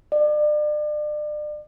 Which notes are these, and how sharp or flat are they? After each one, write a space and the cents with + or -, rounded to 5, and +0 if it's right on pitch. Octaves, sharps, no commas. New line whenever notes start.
D5 +35